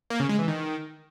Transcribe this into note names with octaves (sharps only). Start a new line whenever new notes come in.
A#3
C#3
G#3
E3
D#3